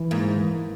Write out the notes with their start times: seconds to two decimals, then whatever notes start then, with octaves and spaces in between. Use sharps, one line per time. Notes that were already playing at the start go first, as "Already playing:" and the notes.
Already playing: E3
0.11 G#2 A#3
0.36 E3